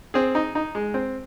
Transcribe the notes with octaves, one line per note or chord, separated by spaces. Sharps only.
C4 G#4
D#4
D#4
G#3
C4